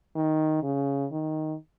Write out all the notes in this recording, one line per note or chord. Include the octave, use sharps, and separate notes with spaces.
D#3
C#3
D#3